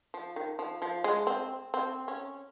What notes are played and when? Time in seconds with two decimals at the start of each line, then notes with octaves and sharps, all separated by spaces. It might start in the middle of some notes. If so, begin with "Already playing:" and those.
0.14 F3
0.36 D#3
0.59 F3
0.82 F3
1.04 G#3
1.27 C4
1.74 C4
2.08 C#4